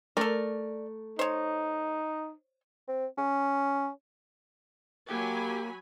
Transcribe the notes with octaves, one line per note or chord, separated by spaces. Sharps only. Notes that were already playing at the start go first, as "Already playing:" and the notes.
A3 A4 A#4 D5
D#4 C5 C#5
C4
C#4
F#3 A#3 G4 G#5 B5